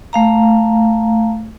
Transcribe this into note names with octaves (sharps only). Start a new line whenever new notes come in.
A3 F5 A#5